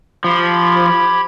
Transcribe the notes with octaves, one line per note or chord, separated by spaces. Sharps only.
F3 G4 B5 G#6